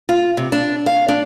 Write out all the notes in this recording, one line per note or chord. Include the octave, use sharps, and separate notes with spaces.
F4
C3
D4
F5
D4